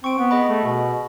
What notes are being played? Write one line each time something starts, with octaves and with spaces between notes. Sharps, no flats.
C4 C#6 D7
B3
G#4 D#5 B5
A3
B2